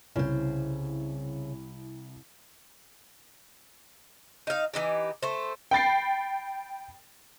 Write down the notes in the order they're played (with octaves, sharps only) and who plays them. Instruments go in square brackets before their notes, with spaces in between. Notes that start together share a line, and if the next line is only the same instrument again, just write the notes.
[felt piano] C2 E4 [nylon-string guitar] C#3 C5
[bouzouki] D#4 F5
E3 D#4 G4
A3 C5
[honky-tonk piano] G5 B5 A6 C7